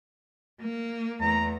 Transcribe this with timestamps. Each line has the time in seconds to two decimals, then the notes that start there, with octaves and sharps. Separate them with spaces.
0.60 A#3
1.21 E2 A3 A#5